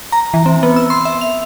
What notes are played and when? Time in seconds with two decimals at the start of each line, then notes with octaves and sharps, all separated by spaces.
0.12 A#5
0.34 E3
0.46 C4
0.63 B3
0.76 E6
0.90 C6
1.05 E5
1.21 F7